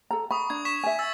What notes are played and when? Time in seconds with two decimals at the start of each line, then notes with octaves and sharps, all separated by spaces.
0.11 A4 A#5
0.31 B5 C#6 D#6
0.50 D4 G#6
0.65 C#6 B6 E7
0.84 E5 G#5
0.99 E6 A6